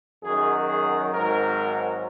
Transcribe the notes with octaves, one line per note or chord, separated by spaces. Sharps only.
F#2 D#3 F#3 G#4
G#4
G#1 G#2 F#3 A#4